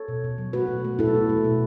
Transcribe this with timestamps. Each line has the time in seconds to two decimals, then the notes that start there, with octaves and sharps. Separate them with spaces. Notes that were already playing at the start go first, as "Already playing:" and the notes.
Already playing: A4 C#5
0.08 B2
0.24 B2
0.38 F#3
0.53 A3 F#4 B4
0.68 B2
0.85 A3
0.99 B2 E4 A4
1.15 A3
1.29 A3
1.44 B2